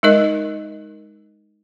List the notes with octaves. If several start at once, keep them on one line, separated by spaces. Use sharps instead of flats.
G#3 D#4 A#4 D#5